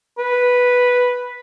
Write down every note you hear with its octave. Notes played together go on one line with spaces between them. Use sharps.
B4